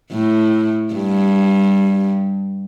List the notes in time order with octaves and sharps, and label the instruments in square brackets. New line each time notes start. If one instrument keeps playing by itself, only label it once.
[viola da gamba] A2
G2